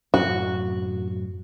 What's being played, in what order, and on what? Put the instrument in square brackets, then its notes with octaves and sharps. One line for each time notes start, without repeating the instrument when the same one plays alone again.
[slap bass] F#2 A2 C3 [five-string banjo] F#4